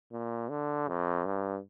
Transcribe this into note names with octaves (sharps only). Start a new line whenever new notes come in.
A#2
D3
F2
G2